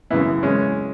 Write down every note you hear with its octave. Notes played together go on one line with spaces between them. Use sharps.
F#2 C#3 E3 B3 E4
C#3 E3 G#3 C#4